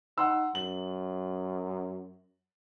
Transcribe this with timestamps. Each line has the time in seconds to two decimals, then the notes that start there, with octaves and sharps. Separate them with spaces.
0.18 D#4 F#5 C6 E6
0.55 F#2 F#7